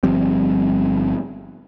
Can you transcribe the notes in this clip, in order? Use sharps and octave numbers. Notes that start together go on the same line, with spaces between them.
G1 F3 G3 C4